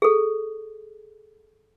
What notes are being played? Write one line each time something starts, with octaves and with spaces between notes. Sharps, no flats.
G#4 A4